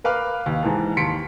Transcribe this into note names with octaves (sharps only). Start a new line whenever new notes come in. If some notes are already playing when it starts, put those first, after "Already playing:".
A#4 B4 F5 D6 F6
D#2
G#2 E3 A5
D#2 A5 C6 B6 C#7 D7